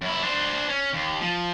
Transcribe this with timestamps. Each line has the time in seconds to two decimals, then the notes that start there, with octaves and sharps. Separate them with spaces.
0.01 F#2 E4
0.23 D4 C5
0.69 C#4
0.93 D#2
1.21 F3